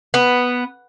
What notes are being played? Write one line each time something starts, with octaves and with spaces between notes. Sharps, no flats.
B3